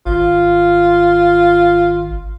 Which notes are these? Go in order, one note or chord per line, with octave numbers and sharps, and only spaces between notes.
G#1 F4